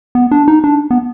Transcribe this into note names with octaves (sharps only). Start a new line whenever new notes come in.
B3
D4
D#4
D4
B3